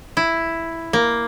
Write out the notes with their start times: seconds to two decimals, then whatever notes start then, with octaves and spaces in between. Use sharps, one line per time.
0.17 E4
0.93 A#3